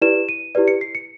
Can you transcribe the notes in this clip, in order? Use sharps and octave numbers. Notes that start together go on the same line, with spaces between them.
E4 G4 B4 D5 E7
D#7
E4 G4 B4 D5
C#7
C7
C#7